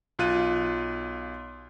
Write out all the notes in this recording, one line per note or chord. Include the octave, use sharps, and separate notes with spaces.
B1 F4 F#6 D#7